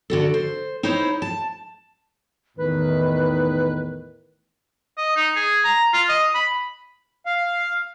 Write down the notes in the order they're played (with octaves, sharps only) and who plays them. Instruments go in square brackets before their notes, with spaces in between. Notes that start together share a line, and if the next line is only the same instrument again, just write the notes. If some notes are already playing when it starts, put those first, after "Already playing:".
[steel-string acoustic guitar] D3 F#4 A4
C5
D#4 E4 C5 C#5
A5
[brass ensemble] E2 A2 D#3 [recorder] B4
[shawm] D#5
D#4
G#4
A#5
F4
D#5
B5
[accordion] F5